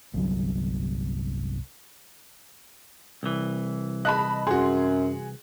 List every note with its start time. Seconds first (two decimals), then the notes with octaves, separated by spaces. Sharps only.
0.14 G1 C2 F#3
3.23 C2 E3
4.05 D#5 A5 B5 F#6
4.47 F#2 F#4 G#4 C6